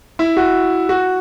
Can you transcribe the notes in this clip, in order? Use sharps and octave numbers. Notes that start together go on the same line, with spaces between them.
E4
F#4
F#4